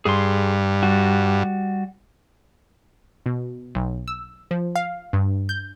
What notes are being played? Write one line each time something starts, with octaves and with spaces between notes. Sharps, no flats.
G2 G#4 C6
G3 F#4
B2
B1
E6
F3
F5
G2
G6